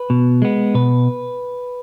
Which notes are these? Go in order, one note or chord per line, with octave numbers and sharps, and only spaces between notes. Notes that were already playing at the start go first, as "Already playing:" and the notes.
Already playing: B4
B2
G#3 B3
B2 B4